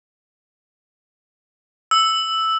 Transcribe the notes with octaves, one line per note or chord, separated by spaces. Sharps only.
E6